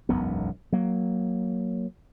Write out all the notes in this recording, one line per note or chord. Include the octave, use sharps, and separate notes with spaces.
E1 B1 F#2 B3
F#3 A#3